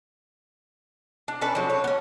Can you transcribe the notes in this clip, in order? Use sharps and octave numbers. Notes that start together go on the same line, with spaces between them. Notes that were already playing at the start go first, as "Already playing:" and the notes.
D4
C#4 D4 A4 B4
F3 F#3
C#5
B3 C#4